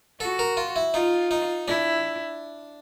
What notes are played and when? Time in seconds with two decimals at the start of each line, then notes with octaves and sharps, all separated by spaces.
0.20 F#4 A4
0.39 A#4
0.57 F4
0.76 E4
0.94 D#4 F4
1.31 D#4
1.68 D4 E4